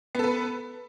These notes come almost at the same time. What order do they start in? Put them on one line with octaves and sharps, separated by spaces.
B3 A4 B4